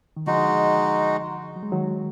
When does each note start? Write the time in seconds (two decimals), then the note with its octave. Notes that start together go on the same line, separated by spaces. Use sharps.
0.17 D#3
0.27 D3 F3 G#3 D#4 F#4
1.56 F#3
1.63 G#3
1.72 D#3 F#3